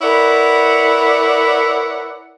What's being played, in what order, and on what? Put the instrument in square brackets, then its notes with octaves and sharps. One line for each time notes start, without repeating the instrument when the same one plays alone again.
[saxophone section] E4 A#4 B4 C#5 D5 F#5